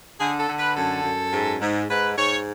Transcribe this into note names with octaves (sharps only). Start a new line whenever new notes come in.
D3 G#4
A4
D3
B4
F#2 A4
F#2
G#2
G#2
G#2 B4
G#2 C#5